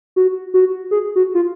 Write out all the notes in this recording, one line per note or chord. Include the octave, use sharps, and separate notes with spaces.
F#4
F#4
G#4
F#4
F4